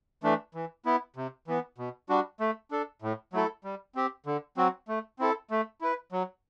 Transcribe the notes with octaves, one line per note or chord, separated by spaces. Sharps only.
E3 A3 D4
E3
B3 E4
C3
E3 B3
B2
G3 D4 F#4
A3
D4 A4
A2
F#3 A3 E4 A4
G3
C4 G4
D3
F#3 C4 F#4
A3
C4 E4 A4
A3
E4 B4
F#3